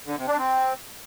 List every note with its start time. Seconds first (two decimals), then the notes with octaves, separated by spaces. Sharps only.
0.06 D3
0.17 C3
0.27 D4
0.38 C4